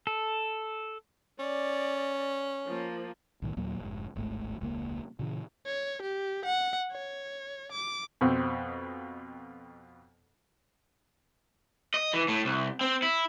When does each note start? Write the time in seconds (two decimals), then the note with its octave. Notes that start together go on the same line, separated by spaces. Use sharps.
0.07 A4
1.40 C#4 D5
2.67 F3 A#3
3.42 B1 A2 D#3
3.57 D#2 A#2 F#3 A#3
3.80 F1 G#2
4.15 D1 G#1 G#2 A3
4.61 E1 C#2 B2 A#3
5.19 A#2 C#3 E3
5.66 C#5
6.02 G4
6.45 F#5
6.92 C#5
7.72 D6
8.21 F2 B2 C4
11.94 D#5
12.13 E3
12.28 A2
12.45 C2
12.81 C4
13.02 E4